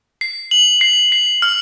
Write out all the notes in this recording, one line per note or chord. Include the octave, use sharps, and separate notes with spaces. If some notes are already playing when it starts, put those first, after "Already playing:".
C7
F#7
C7
C7
F6